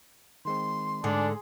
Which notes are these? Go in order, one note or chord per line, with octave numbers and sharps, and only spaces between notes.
D#3 G#3 C4 C6
G#2 D3 D4 G#4 G#5 C6